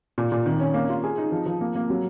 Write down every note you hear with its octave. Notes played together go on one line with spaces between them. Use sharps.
A#2
A#2
D#3
C#4
A#3
F4
G#4
D#4
F3
F3
A#3
A#3
F#3